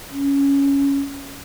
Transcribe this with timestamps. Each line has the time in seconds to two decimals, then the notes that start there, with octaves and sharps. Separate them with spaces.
0.10 C#4